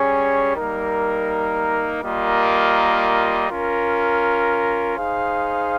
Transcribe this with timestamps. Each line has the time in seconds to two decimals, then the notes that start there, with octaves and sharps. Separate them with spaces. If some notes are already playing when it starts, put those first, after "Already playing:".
Already playing: G3 C#4 G#4 C#5
0.56 G3 A#3 D#4 A#4
2.03 G3 A#3 F4 A#4 D#5
3.49 C#4 F4 A#4
4.97 D#4 G#4 C5 F5